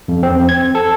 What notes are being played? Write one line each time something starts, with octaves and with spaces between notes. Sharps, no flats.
F2
C4
G#6
A4